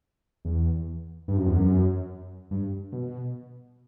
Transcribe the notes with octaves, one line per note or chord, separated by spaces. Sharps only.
E2
G2
F#2
E2
F#2
G2
B2